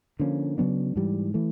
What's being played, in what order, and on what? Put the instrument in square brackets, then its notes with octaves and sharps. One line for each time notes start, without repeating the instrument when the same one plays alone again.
[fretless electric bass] D3 F3 A#3 C#4
C#3 F#3 B3 D4
G#2 E3 G3
E3 A3